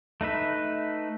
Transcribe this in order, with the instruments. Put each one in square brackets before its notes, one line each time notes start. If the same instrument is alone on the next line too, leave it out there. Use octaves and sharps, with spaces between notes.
[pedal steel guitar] A3 D#4 B4 E5